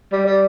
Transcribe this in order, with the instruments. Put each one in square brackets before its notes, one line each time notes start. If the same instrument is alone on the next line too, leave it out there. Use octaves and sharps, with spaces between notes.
[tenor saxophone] G3
G3